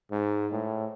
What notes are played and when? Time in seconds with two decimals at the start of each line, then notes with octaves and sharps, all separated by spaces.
0.11 G#2
0.52 A2